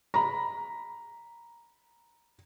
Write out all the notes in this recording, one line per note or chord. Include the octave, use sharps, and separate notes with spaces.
A#5 B5